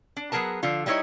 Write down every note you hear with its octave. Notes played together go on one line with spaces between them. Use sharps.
D4
F#3 B3 G#4 A#4 A5
D3 F3 F4
G3 D#4 E4 C5 C#5 D#5